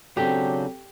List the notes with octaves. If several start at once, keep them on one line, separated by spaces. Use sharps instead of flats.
C#3 F#3 C4 D4 G4 A4 G5